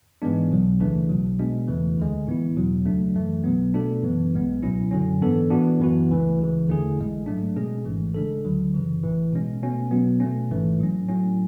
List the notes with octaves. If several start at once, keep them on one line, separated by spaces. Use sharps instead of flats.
G#2 E3 G#3 B3 D4
B1 B2 F#3
D2 C#3 E3 A3 D4
B1 B2 F#3
B2 G#3 D4
E2 C#3 E3 A3
D2 D3 G#3
A2 E3 B3 E4
E2 B2 F#3
D2 C#3 F#3 A3 D4
F#2 E3 A3
B1 B2 F#3 B3
B2 A3 D4 A4
F#2 E3 B3
B1 A2 G#3 B3
C#2 B2 F#3 C#4 E4
F#2 D3 F#3 C#4
G#2 E3 B3 D4 A4
A2 E3 B3 D4 F#4
F#2 E3 B3 F#4
C#2 C#3 E3 A3
C#2 C#3 E3
E2 D3 A3 E4 G#4
A1 A2 G#3
G#2 F#3 A3 D4
B2 G#3 C#4 G#4
G#1 G#2 E3 A3
C#3 G#3 D4 A4
D2 D3 F#3
F#2 C#3 E3
A1 A2 E3
B2 G#3 C#4
B2 A3 C#4
B2 F#3 B3
B2 A3 C#4
A1 G#2 E3 A3
A2 F#3 C#4
A2 F#3 C#4